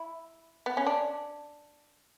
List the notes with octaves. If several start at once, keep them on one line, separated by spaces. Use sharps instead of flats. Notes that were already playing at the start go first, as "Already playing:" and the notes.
Already playing: E4
B3
C#4
D4